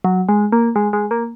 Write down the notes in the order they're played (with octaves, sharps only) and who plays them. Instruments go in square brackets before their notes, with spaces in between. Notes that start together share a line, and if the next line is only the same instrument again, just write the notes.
[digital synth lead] F#3
G#3
A#3
G#3
G#3
A#3